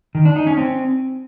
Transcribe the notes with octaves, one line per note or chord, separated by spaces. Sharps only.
D#3
D4
D#4
C#4
C4